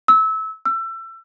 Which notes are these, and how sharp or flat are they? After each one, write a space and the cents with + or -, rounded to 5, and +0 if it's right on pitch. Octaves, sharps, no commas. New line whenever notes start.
E6 -25
E6 +30